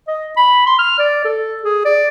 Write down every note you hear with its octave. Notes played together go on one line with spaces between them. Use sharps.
D#5
B5
C6
F6
D5
A4
G#4
D5